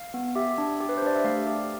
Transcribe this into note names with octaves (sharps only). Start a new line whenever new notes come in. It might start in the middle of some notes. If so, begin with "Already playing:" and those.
Already playing: F5
B3
G4 E5
D4
G4
B4
C5
D4 D5
E5
A3 F5
G4